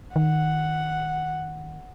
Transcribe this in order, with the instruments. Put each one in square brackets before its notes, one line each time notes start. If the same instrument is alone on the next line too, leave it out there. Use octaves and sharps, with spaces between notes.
[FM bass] D#3 [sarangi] F#5